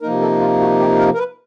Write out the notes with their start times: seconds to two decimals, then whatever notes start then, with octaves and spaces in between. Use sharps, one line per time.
0.02 C3 F3 A#3 D#4 A#4
0.21 A4
0.40 F4
0.60 F#4
0.79 G4
0.99 A#4
1.14 A#4
1.18 B4